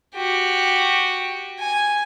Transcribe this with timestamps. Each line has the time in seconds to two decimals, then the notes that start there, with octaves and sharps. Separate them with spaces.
0.16 F#4 G4
1.60 G#5